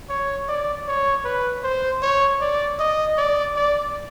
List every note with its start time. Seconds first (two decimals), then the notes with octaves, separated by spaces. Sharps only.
0.09 C#5
0.49 D5
0.87 C#5
1.25 B4
1.64 C5
2.02 C#5
2.41 D5
2.79 D#5
3.18 D5
3.56 D5